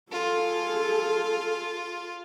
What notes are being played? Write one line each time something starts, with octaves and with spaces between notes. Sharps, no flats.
F4 G#4 A4